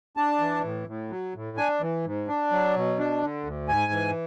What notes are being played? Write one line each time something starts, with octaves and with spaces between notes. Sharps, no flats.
D4 A5
E3
A2
A2
F#3
A2
D4 G#5
E3
G#2
D4
F#3
B2
D4
D3
D2
G#2 G#5
E3